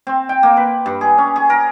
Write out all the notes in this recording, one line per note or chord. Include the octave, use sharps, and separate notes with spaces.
C4
G5
A#3
B4
G2
G#4
C#4
G#4
A#4